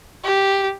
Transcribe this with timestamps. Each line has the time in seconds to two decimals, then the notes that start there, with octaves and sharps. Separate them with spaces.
0.25 G4